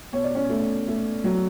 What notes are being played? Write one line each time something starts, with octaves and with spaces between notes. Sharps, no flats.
B2 C#5
D5
C#4 C#5
A3
A3
F#3